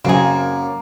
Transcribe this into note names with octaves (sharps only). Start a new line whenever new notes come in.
F#2 C#3 F#3 A#3 C4 G#4